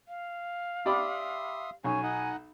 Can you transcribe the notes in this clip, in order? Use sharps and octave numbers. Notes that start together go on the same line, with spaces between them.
F5
G4 D5 E5 B5 C6 D#6
B1 C#4 C#5 G#5
D#4 D#5 F#5